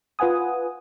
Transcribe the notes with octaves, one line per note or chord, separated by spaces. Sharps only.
F4 B4 F#5 G#5 D#6